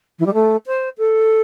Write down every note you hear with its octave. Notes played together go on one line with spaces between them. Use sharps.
E3
G3
A3
C5
A4